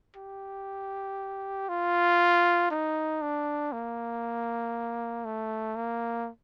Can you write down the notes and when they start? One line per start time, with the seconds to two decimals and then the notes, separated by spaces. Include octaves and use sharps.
0.16 G4
1.69 F4
2.70 D#4
3.22 D4
3.72 A#3
5.25 A3
5.76 A#3